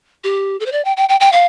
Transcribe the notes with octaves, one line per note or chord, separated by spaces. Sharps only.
G4
A4
C5
D5
G5
G5
G5
G5
F5